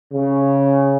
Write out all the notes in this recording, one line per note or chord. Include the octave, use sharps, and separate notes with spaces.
C#3